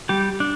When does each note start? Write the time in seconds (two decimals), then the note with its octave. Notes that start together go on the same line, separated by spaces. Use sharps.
0.09 G3 G4
0.40 D4